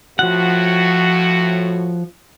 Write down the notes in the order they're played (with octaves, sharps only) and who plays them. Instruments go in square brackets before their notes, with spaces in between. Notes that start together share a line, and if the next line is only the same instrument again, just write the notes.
[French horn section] A2 F#4 [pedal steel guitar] F3 F#5